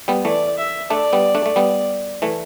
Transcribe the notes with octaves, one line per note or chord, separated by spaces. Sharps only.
G3 B3
E3 A3 D5
E5
A3 D4 D5
G3 B3
A3 D4
A3
G3 B3
E3 A3